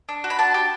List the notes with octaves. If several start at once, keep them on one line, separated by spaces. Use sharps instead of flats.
D4
F#4
B5
D4 A5
G4